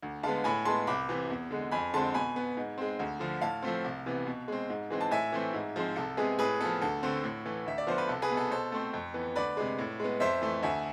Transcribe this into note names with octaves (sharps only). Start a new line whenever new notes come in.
D2
D3 G#3 B3 F5 A5
A2 G#5 B5
G#3 B3 A5 C6
C2 B5 D6
C3 E3
E2
D3 G#3
F2 G#5 B5
D3 G#3 C4 A5 C6
B2 G#5 B5
B3
G#2
G#3 C4
D2
D3 F3
A2 F5 A5
F3 A3 C4
C2
C3 E3 B3
B2
G#3 C4
G#2
E3 G#3 C4
A5
A2 E5 G#5
E3 A3 C4
G#2
F3 G#3 C4
C2 A4
C3 G#3 B3 G#4
A2 G#4 B4
F3 B3 A4
D2 A4
D3 A3 C4
A2
E3 A3
D2 E5
D5
D3 F3 B3 C5
B4
C2 A4
G#4 B4
B2 B3
A4
B2 A4 C5
A3 C4
F2
E3 B3
D2 B4 D5
C3 G#3
A2
G#3 B3
F2 C5 E5
E3 A3
D2 E5 G#5